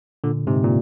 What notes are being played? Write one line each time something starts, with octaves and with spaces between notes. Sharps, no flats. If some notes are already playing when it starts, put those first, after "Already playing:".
A#2 D3
G#2 C3
A#2